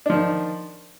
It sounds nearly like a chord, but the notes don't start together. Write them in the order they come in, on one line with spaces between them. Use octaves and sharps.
D4 F3 D#3